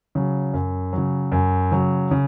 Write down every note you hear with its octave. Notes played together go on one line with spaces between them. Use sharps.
C#3 F#3
F#2
C#3 F#3
F#2
C#3 F#3
C#3